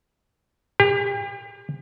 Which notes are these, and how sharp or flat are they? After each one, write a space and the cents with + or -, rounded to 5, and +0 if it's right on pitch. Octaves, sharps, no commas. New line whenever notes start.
G4 +40